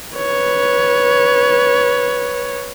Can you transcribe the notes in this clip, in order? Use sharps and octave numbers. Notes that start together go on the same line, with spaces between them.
B4 C#5